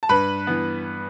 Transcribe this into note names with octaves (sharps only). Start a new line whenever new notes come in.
A5
G2 B4 B5
E3 B3